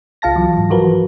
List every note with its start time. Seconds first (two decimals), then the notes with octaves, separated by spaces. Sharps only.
0.22 C2 F4 F5 A5 A#6
0.36 E3 F#3
0.58 G#2
0.70 E3 F3 F#4 A#4 B4